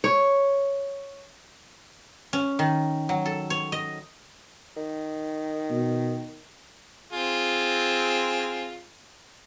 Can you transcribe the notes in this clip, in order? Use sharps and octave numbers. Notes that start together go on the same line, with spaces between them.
C#5
C#4
D#3
F#3
A4
C#5
D#5
D#3
B2
C4 F4 G#4